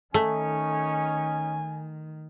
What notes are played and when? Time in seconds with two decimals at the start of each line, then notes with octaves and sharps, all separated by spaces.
0.14 D#3 A3 C#4 D#4 G#5